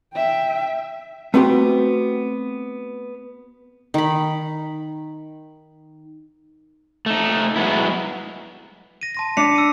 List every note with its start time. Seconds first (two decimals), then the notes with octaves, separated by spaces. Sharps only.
0.14 E5 G5
1.34 A3 B3 C4 F#4 G4
3.94 D#3 B5
7.06 A3 D#4
7.56 F#3 G#3 B3 E4
9.01 A#6 D#7
9.15 A5 C6 A#6
9.37 D4 B6 C#7 F7
9.56 E6 D#7